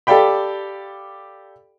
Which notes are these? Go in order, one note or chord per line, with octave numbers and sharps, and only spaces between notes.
G4 A4 D5 F5 G5 B5